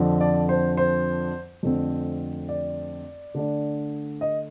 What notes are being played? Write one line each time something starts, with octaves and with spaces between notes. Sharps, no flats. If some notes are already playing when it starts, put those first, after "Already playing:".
Already playing: F2 D3 F3 C4
D5
C5
C5
F2 D3 A3 C4
D5
D3 A3 D4
D#5